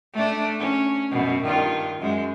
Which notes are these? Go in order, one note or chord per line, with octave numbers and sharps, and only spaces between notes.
A3 D4
C#4
F#2 B2
G2 D#3 F4
F#2 G#3